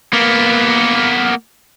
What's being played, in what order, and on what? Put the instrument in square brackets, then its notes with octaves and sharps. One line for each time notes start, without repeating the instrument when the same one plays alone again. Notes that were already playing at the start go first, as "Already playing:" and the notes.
[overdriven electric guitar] A#3 B3